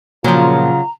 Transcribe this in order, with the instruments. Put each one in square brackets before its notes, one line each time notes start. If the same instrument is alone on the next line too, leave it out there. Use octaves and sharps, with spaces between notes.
[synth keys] A#2 F3 [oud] C#3 F#3 [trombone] F4 [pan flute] A#5